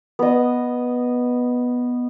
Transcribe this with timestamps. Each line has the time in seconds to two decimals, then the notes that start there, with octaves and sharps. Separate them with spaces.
0.19 B3 D#5